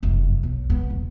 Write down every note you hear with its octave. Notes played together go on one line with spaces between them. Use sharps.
F1 F#2
B1
C#3 B3
D#1